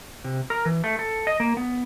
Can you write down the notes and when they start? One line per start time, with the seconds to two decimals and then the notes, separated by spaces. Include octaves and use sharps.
0.24 C3
0.50 A#4
0.66 E3
0.84 A3
0.99 A4
1.27 D#5
1.40 A#3
1.57 B3